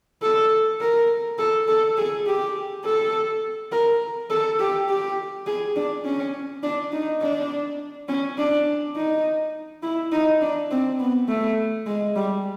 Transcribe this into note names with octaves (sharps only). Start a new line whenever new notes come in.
A4
A#4
A4
A4
G#4
G4
A4
A#4
A4
G4
G4
G#4
D4
C#4
D4
D#4
D4
C#4
D4
D#4
E4
D#4
D4
C4
B3
A3
G#3
G3